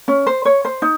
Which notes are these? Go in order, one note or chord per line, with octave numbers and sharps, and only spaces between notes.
C#4
C5
C#5
C5
D#4